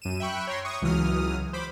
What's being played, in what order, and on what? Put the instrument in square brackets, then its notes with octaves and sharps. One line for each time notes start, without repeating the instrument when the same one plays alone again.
[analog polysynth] F#2 D#7 E7
E5 G5 B5 C#6 F#6
C#5 G5 A#5 C6
C#6 D#6
C#2 E3 F#3 D#6 F6
C5 B5 D6